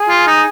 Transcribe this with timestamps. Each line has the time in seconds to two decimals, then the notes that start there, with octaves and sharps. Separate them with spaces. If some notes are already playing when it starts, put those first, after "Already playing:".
Already playing: G#4
0.09 F4
0.27 D#4